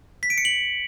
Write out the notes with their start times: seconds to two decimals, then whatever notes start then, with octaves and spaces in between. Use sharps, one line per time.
0.23 B6
0.30 D7
0.38 C#7
0.45 F#7